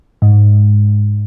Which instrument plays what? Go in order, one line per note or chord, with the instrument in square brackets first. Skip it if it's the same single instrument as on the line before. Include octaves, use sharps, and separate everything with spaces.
[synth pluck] G#2